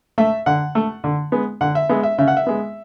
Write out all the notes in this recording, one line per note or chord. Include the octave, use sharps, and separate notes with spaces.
A3 E5
D3 F#5
A3
D3
G#3 B3
D3 F#5
E5
G#3 B3 E5
E5
C#3 E5
F#5
E5
G#3 B3